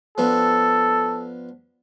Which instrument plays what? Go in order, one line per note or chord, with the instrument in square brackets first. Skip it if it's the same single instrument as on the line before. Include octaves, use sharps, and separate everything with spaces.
[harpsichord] F3 B3 D4 [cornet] A4